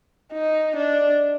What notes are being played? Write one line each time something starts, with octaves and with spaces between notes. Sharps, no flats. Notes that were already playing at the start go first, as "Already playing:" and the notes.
D#4
D4